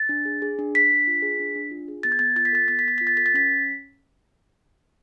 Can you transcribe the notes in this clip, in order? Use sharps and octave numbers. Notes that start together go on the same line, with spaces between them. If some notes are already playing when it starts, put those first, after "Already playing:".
Already playing: A6
D4
G#4
G#4
D4
D4 B6
D4
F4
G#4
D4
D4
F4
G#4
B3 A6
G#6
B3 A6
F4 A6
B6
A4 A6
B3 A6
B6
B3 A6
F4 B6
A6
A4 B6
A6
C#4 B6